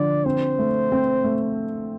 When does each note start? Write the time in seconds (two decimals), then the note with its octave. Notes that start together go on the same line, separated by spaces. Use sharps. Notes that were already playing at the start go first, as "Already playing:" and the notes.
Already playing: D3 F3 D5
0.25 C4 C5
0.59 A3
0.92 C4
1.24 A3